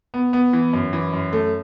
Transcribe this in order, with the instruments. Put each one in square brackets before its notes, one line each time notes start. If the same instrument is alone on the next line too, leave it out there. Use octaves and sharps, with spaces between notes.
[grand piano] B3
B3
E3
F#2
E3
F#2
A3